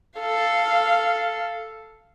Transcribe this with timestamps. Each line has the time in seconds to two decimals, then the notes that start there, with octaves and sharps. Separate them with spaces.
0.20 A4 F5